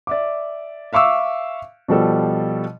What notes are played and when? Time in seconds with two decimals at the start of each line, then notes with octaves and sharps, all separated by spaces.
0.07 D5 E5 D6
0.93 E5 F5 C#6 D6 E6
1.88 B2 F3 G3 A4